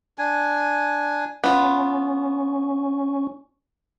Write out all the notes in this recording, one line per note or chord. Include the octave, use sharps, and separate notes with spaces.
D4 G#5
B3 C#4 F4